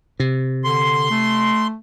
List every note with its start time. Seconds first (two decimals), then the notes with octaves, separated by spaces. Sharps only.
0.20 C3
0.64 D3 C6
1.11 A3